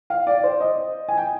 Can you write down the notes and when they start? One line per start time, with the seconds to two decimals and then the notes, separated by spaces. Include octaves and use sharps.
0.10 F5
0.27 D5
0.44 C5
0.60 D#5
1.08 G#5
1.18 G5